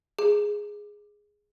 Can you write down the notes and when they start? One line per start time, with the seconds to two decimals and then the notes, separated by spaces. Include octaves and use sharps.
0.19 G#4